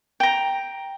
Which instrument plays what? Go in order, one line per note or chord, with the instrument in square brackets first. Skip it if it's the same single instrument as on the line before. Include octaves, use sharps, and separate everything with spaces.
[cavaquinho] G5 A#5